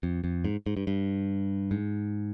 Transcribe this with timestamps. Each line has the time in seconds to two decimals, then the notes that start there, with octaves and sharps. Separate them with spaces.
0.03 F2
0.24 F2
0.45 G#2
0.66 G#2
0.77 G2
0.87 G2
1.71 G#2